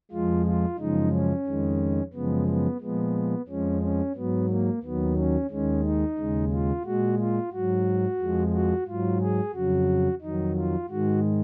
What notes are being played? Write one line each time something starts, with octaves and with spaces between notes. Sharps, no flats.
F2 F3 G#3 F4
F4
F#2 C#3 F3 G#3 D#4
C#4
F2 D#3 G#3
F#2 C#3 F3 G#3 B3
B3
A#2 F3 G#3 B3
F2 F3 G#3 C#4
C#4
G#2 F#3 B3
A#3
D#2 D#3 F#3 B3
C#4
D#2 D#3 G#3 C#4
D#4
D#2 C#3 G#3
F4
A#2 G#3 F#4
F4
G#2 F#3 F#4
F2 F3 G#3
F#4
G#2 F#3 F4
G#4
F2 C#3 F#3 F#4
F2 D#3 F#3 D#4
F4
G#2 D#3 G#3 F#4